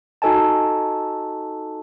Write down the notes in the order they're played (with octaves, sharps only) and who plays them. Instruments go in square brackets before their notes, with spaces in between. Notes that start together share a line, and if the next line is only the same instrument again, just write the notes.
[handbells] D#4 F#4 A4 D#5 G#5 A5